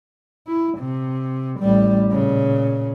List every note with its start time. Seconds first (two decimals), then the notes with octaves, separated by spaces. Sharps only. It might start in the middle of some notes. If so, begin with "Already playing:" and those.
0.47 E4
0.78 C3
1.60 A1 G3
2.12 A#2 C#3